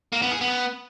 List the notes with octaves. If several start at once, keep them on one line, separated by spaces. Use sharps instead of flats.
A#3
B3
G#4
B3